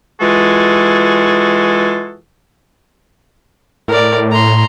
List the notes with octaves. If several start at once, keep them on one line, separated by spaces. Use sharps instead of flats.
E3 G#3 F4 F#4 G#4 A4
A2 A#4 D5
A#5 C6